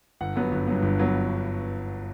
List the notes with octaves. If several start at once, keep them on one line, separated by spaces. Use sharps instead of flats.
G1 F#5
G2 F#3 B3
G1
G2 F#3 B3
G1
G2 F#3 B3